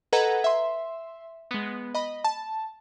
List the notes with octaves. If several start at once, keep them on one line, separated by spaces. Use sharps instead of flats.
A4 B4 D#5 F#5 A#5 G#6
E5 C6
G#3 B3
D#5 B5
A5